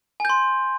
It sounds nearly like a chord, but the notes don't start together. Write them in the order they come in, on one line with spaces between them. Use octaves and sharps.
G#5 G6 C6